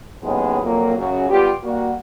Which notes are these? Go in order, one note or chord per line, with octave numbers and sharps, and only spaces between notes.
D#2 A2 C#3 F#3 G#3 B3
F2 A#2 F#3 A#3
F#2 C#3 F#4
G3 B3 F4 G4
G3 A#3 F#4